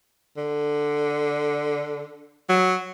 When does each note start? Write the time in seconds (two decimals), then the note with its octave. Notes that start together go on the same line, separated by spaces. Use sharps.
0.37 D3
2.49 F#3